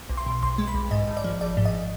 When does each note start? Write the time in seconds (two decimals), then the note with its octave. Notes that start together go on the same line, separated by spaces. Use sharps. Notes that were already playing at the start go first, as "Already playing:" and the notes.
0.10 B1
0.17 C6
0.26 B2
0.43 B1 C6
0.58 G#3
0.67 B5
0.75 B1
0.91 G#2 D#5
1.08 G#1
1.17 D5
1.24 F3
1.41 G#1 D5
1.57 G#2
1.65 D#5